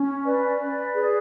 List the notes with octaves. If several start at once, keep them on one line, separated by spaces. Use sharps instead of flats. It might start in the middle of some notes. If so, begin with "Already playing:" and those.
Already playing: C#4
B4 D5
B4
G#4